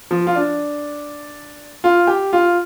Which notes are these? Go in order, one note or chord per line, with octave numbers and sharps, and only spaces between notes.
F3
F4
D4
F4
G4
F4